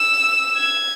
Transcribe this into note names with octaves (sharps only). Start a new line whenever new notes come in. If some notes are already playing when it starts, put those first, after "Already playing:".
Already playing: E6
G#6